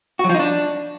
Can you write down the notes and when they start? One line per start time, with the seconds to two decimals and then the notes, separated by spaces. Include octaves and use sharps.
0.19 F#4
0.24 F#3
0.29 F3
0.34 D#4
0.40 D4